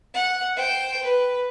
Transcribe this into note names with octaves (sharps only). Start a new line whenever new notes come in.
F#5
C5 G5
B4